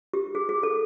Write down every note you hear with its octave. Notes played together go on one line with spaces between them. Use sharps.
G4
G#4
G#4
A4